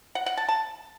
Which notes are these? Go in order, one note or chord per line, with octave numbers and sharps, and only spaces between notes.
F#5
F#5
A5
A5